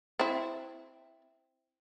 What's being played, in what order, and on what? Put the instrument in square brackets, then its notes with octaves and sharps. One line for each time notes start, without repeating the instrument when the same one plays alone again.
[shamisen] C4 E4